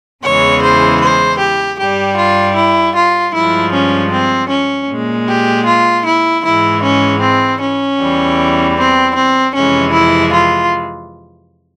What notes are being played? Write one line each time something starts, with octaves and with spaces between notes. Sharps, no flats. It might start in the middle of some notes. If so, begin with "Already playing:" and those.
E2 C#3 E3 G#3 C#5
C5
C5
G4
G2 G3 G4
F4
E4
F4
G2 F3 G#3 E4
C#4
C4
C#4
A#2 G#3
G4
F4
E4
G#2 E3 G#3 E4
C#4
C4
C#4
E2 E3 G3
C4
C4
F2 C3 E3 G#3 C#4
E4
F4